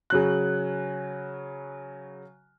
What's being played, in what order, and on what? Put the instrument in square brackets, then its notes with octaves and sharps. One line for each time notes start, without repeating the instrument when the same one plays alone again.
[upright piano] C#3 F#3 F#6